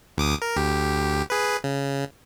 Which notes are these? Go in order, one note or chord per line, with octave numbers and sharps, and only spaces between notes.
D2 D6 D#6
A#4
D2 G4
G#4 B4
C#3